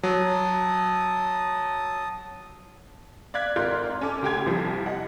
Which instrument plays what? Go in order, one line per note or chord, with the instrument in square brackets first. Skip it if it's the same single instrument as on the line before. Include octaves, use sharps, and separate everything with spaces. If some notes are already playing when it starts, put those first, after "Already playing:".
[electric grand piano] F#3 [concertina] A5 D#6
[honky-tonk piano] D5 F5 F#6 G#6 B6
G#1 F4 A#4 D5 C6 G6
C#4 A4 D6
D2 A2 G4 G5 G#5 G#6
C2 F3 G3
D#5 F#5